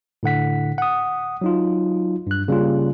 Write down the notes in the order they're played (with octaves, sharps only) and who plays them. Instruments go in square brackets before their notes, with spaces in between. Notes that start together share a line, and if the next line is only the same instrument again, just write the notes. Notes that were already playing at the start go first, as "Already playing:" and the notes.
[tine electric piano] A2 D3 F#5 B6
F#5 D#6
F#3 D#4 F4
G2 F#6
C#3 G3 A#3 C#4 F4